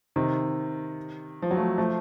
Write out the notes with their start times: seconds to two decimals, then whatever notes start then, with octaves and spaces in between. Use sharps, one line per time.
0.16 C3 D#3
1.42 F3
1.51 F#3
1.57 F3 A3
1.78 F3 A3